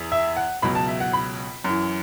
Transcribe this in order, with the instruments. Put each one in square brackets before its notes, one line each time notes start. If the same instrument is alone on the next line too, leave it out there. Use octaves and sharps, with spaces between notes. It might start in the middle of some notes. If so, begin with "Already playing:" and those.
Already playing: [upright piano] E2 E3
E5
F#5
C#2 B2 F#3 B5
A5
E5
F#5
B5
F#2 E3